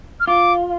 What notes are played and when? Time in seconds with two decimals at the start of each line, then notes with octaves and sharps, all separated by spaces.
0.20 F6
0.27 F4 D6